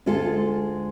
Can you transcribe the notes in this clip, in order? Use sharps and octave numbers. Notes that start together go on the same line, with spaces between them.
D2 G#3 F4 A4